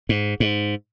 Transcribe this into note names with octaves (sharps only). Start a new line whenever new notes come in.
G#2
G#2